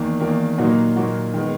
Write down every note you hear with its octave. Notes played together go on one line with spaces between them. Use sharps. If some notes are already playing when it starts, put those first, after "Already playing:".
Already playing: E2 D#3 A#3
E2 D#3 A#3
A#2 F#3 A#3 D#4 F#4
A#2 F#3 A#3 D#4 F#4
D#3 G#3 B3